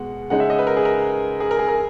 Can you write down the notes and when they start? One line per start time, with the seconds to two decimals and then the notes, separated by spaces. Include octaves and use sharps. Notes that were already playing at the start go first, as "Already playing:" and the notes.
Already playing: B2 G#3 F#5
0.30 C#3 G#3 D#4 F#5
0.40 E5
0.50 D#5
0.59 B4
0.67 A#4
0.77 G#4
0.85 A#4
1.40 G#4
1.51 A#4
1.59 G#4
1.68 A#4